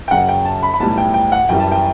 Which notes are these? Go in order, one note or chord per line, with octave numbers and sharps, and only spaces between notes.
G5
F#2 C#3 F#3 F#5
G5
A5
B5
B5
B1 A2 E3 G3 A5
G5
G5
F#5
F#2 E3 G3 G5
A5
G5